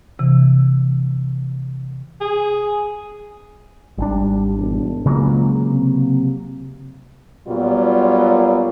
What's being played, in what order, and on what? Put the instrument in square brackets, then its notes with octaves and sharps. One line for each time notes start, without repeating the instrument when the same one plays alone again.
[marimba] C3 E3
[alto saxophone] G#4
[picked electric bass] G#1 D4 [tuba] G3
[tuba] E1
[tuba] C#2 [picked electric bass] C#3 F#3 A#3
[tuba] C3
[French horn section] A#2 F#3 G3 B3 F4